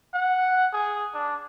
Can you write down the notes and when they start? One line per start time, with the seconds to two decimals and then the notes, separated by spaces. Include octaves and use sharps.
0.14 F#5
0.73 G#4
1.14 D4